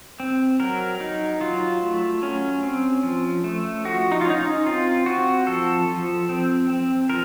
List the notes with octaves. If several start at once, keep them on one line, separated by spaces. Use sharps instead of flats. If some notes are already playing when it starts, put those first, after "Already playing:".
C4
F#3 A#4
F#3 D#4
F#3 F4
A3
F#3 C#4
C4
F3
A3
F3 F#4
D#4
F4
C#4 D#4
D#4
C4 F4
C4 F#4
F3 A4
F3
C4
C4
F3 A#4